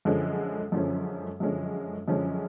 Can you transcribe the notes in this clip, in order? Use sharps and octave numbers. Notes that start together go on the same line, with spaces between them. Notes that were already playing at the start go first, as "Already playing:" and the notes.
F#2 D3 F3 G#3 C#4
F#2 D3 F3 G#3 C#4
F#2 D3 F3 G#3 C#4
F#2 D3 F3 G#3 C#4